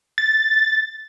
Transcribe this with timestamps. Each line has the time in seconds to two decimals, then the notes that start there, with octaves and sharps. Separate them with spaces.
0.18 A6